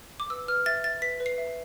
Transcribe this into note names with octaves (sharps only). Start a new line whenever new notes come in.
D6
B4 E6
B4 F6
E5 A6
E5 A6
B4 B6
B4
C7
E5